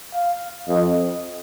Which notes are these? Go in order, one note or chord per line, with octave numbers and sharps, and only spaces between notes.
F5
F2 D#5